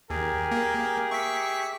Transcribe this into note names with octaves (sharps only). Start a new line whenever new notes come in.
D#2 G4 G#4 A#4 G#5
A#3
E5 C#6 D6 B6